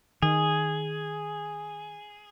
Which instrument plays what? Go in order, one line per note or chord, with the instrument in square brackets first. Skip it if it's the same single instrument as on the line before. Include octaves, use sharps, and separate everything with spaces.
[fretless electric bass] D#3 [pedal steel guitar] G#4